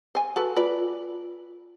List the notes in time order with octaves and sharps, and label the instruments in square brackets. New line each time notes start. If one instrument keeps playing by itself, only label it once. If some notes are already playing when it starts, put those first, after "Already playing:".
[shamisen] C5 G#5
F#4 A4 B4
[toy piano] F4 [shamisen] B4 D5